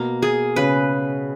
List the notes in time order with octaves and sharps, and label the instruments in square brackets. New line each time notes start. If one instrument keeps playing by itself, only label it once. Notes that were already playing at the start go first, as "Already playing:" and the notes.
Already playing: [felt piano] B2 [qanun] A#3
[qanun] G#4
[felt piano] C#3 [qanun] B4